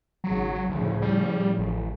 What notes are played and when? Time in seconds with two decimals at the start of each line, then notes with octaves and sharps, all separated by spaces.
0.24 G#1 C#3 F#3
0.70 D2 A2 C#3 F3
1.02 G3
1.59 A1